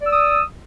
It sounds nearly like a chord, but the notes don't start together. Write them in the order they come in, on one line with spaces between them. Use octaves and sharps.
D5 E6 D#6